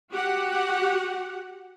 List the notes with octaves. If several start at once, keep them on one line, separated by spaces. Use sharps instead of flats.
F#4 G4 F#5